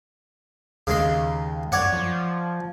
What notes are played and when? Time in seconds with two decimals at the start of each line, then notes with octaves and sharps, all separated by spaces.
0.87 D#2 C#3 G#3 C6
1.72 F#2 C#5 D5 F#5
1.92 F3